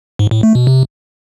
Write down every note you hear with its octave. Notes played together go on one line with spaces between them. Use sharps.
G#2
A2
A3
B2
C3